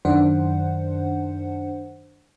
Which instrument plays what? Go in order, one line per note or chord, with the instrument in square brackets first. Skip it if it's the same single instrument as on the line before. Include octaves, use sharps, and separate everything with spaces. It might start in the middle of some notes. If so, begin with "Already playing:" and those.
[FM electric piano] F#2 D#3 D4 C5 F#5